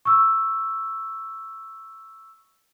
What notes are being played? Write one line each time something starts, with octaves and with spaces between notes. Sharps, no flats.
C#6 E6